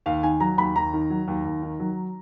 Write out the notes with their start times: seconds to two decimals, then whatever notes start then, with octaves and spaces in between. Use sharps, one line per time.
0.06 D#2 F5
0.23 D#3 G#5
0.40 F#3 A#5
0.58 D#2 B5
0.76 D#2 A#5
0.93 D#3
1.10 F#3
1.28 D#2
1.45 D#2
1.62 D#3
1.80 F#3